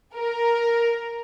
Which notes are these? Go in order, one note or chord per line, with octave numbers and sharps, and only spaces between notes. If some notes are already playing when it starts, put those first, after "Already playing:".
A#4